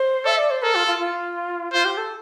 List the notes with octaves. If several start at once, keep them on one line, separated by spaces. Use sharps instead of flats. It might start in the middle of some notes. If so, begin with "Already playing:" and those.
Already playing: C5
A4 E5
D5
C5
A4 A#4
F4
F4
F4
F4 C5
G4
A4